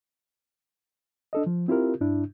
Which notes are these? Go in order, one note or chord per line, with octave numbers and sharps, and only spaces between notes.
D4 A4 D#5
F3
C4 E4 F4 G4 A#4
G2 D4 E4